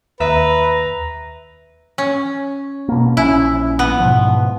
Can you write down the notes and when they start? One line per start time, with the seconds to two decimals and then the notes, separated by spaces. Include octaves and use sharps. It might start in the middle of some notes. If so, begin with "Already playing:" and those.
0.20 D#2 B4 E5 A#5
1.98 C#4
2.89 B2 A#3
3.17 A#1 C#4 E4
3.79 B3
4.00 G#2 B2 F3